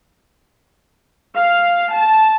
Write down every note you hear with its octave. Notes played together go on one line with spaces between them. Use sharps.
F5
A5